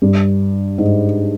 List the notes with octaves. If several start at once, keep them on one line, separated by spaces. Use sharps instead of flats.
G2
G#2